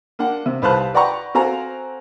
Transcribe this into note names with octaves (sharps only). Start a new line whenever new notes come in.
A#3 D4 F#5
C3
C2 B4 C5 F5 A5 F#6
B4 D5 F#5 G5 A#5 C#6
C4 F#4 A4 F5 G#5 A#5